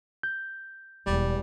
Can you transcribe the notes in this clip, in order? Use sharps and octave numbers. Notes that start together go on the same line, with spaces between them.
G6
E1 E2 G3 G#3